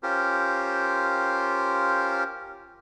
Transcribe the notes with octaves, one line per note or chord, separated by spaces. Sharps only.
C#4 F4 G4 A#4 C5